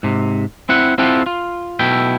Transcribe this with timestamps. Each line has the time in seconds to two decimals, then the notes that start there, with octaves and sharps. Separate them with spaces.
0.03 G#2 C3
0.69 C4 E4 F#5
0.98 C4 E4 F4 G4 A4 F#5
1.26 F4
1.79 B1 B2 A3 E4 G5